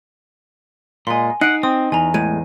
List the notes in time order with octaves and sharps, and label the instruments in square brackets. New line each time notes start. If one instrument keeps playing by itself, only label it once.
[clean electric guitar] A#2 G#3 [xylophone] G#5 C6
[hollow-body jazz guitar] D#4 [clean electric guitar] F#5 [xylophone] C7 D7
[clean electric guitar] C4 [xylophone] D#6
[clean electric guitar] E2 [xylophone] G#5 A#5
[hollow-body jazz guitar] A2 G#3 [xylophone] D#7